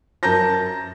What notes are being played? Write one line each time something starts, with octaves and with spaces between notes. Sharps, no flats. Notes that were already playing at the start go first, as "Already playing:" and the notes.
F#2 A5 A#5 G6 A#6